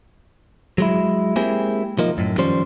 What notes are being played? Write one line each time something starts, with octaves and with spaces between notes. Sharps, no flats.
F#3 G#3 E4
G#3 A#3 C4 E4 G4 G#4
F3 A#3 D#4
F#2 A2
D#3 F3 G3 C#4 C5